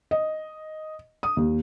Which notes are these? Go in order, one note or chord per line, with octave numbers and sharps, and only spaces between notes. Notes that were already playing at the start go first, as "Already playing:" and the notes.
D#5
D#6
D#2